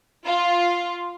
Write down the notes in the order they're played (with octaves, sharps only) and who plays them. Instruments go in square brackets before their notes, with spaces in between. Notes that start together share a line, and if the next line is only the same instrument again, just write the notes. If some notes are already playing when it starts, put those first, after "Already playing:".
[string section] F4